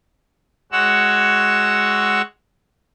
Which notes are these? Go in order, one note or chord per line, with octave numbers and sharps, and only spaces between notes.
G#3 F#4 C#5 F#5 E6